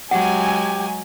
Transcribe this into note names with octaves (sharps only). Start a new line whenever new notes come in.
F#3 G#3 G4 F#5 G#5